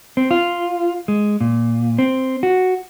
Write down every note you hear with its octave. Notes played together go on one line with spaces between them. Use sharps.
C4
F4
G#3
A#2
C4
F#4